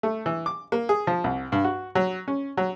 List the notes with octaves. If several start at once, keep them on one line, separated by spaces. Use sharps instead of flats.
A3
E3
D6
A#3
G#4
F3
C2
G2
F#4
F#3
C#4
F#3